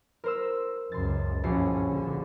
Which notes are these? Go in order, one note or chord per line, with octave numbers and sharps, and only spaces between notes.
A#4 C5 E6
C#2 F#2 C6 A6
A#1 G2 C#4 F#4 C7
D3